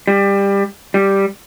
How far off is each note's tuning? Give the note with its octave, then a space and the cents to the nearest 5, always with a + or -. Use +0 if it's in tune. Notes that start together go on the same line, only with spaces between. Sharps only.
G3 +20
G3 +0